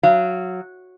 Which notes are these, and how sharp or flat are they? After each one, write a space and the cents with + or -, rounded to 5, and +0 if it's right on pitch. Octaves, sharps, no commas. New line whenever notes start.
F#3 -10 F5 -30